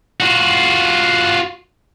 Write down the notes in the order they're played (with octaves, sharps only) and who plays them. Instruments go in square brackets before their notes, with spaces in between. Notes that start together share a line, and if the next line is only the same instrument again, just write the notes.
[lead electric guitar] F4 F#4